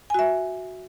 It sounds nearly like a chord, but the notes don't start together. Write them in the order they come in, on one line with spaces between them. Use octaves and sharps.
G#5 F#4 E5